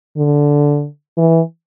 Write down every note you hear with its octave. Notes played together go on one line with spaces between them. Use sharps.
D3
E3